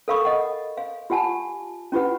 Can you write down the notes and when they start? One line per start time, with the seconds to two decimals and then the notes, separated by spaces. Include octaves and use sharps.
0.08 A4 A#4 F5 B5 C#6 D#6
0.25 D#5 F#5
0.77 F5
1.10 F4 G4 F#5 G#5 A5
1.92 C#4 E4 F4 G4 B4 F#5